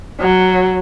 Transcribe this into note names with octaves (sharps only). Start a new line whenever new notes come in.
F#3